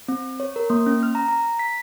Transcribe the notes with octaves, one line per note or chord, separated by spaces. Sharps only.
C4
C#5
A#4
A#3
C#4
F6
A#5
A#5
B6